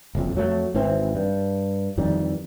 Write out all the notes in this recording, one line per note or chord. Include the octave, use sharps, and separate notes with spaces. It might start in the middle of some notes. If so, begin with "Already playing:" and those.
F#1 F2
F2 F#3 A3
G#1 E3 C4
G2
F2 D#3 E3 G3